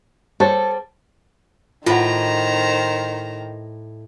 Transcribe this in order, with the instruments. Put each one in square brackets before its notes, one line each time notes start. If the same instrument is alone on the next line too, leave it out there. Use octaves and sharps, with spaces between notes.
[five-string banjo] G3 C5 C#5 [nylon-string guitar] A4
[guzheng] A2 [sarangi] D#3 [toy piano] F4 F#5 [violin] C5 A#5